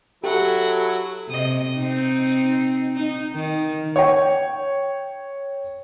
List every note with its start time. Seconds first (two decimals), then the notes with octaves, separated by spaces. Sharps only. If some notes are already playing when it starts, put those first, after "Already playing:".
0.24 F#3 E4 G4 A4 F#5
1.28 C3 D#5
1.77 C4 D#4
2.96 D#4
3.34 D#3
3.96 C#5 G5